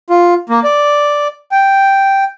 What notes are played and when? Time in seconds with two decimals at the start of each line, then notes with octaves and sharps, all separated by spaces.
0.10 F4
0.49 A#3
0.64 D5
1.52 G5